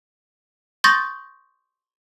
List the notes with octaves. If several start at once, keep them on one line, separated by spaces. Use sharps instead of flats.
C6 C#6 D#6 G6 A6 A#6